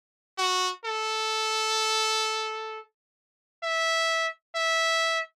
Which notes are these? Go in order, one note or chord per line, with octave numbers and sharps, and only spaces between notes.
F#4
A4
E5
E5